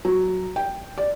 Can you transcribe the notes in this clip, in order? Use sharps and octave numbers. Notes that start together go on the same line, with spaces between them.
F#3
G5
D5